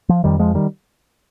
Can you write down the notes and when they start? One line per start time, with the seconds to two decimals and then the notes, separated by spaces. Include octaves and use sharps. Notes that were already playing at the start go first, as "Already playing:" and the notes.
0.09 F3
0.24 F2 D#3 G3
0.39 F3 G#3
0.55 D#3 G3